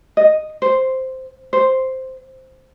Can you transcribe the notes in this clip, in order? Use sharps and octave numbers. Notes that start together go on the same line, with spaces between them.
D#5
C5
C5